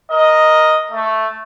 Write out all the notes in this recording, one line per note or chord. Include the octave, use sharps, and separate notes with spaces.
A#4 D#5
A3